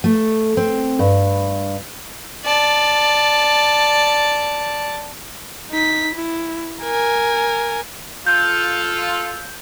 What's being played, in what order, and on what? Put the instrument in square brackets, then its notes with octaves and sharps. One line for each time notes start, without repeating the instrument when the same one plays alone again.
[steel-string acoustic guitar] A3
C4
G2
[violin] D5 A5
[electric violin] D#4 B6
E4
A#4 G#5
[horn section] F4 A4 [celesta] G6